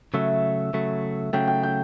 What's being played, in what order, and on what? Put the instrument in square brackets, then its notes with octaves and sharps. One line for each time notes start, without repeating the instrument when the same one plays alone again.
[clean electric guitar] C#3 F#3 A3 [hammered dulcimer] E5
[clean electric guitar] C#3 F#3 A3
[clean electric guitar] C#3 F#3 A3 [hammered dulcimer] G5
[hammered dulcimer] G5
G5